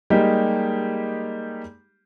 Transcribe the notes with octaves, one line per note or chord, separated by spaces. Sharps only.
G3 G#3 A#3 D#4 G4